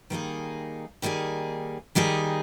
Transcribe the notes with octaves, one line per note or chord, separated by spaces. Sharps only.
D#3 G3 A#3 D#4 G#4
D#3 G3 A#3 D#4 G#4
D#3 G3 A#3 D#4 G#4